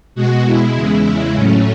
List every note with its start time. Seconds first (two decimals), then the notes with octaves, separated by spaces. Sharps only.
0.15 B2 G#3 F#4
0.44 B2 G#3 E4
0.75 E2 C#3 G#3 E4
1.04 E2 C#3 G#3 E4
1.34 A2 F#3 A3 C#4